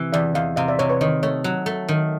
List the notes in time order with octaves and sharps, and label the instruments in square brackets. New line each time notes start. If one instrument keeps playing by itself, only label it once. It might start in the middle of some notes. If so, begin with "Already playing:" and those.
Already playing: [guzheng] C3 E3
[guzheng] E2 [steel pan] D5 E5
[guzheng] E2 [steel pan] D#5 F5
[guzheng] C3 [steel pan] D#5 F5
[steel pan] D5 E5
[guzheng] C3 [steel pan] C#5 D#5
[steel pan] B4 C#5
[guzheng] D#3 [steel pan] C#5 D#5
[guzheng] A3 [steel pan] C#5 D#5
[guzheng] F#3
A3
D#3